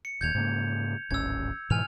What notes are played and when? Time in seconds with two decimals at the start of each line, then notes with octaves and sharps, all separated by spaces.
0.05 C#7
0.21 D#1 D#2 G6 G#6 F7
0.35 G#2 C#3 A#3
1.11 D1 G#1 C#4 E6 G#6
1.70 G#2 B2 E3 G#5 F6 F7